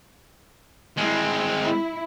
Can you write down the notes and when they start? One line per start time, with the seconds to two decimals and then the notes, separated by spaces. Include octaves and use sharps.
0.97 G3 G#3 C4 E4
1.62 E4